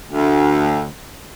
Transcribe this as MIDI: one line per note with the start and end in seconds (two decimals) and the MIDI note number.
0.11 0.86 38